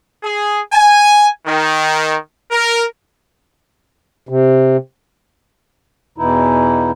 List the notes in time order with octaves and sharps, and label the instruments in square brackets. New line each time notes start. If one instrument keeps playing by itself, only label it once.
[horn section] G#4
G#5
D#3
A#4
[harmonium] C3
E2 B2 E3 D#4 E4